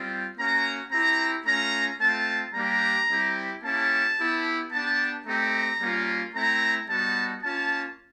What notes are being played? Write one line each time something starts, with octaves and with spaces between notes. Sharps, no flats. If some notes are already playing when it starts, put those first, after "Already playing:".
Already playing: G3 C4 F4
A#3 C#4 F#4 A#5
C4 E4 G4 A#5
A3 C#4 F4 A#5
A3 C4 F4 A5
G3 A#3 D4 G4 A#5
G3 C4 E4 G4
A#3 C#4 E4 G4 A5
B3 E4 G4
B3 D4 G4 A5
A3 C4 D#4 G4 A#5
G3 A#3 C#4 F4
A3 C4 E4 A#5
G3 B3 D#4 F#4 A5
A#3 C#4 F4 A5